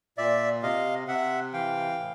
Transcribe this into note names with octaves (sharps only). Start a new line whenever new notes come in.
A#2 D5 E5
C3 D#5 F5
C3 E5 F#5
E3 F5 G5
A2